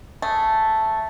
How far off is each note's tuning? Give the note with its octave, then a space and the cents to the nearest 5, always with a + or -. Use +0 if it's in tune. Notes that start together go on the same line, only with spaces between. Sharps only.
A3 +0 G#4 +0